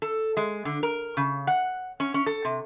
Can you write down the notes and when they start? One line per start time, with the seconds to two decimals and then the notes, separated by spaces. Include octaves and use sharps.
0.02 A4
0.37 G#3
0.65 D3
0.83 A#4
1.17 C#3
1.47 F#5
2.00 C#4
2.14 C#4
2.26 A4
2.45 C3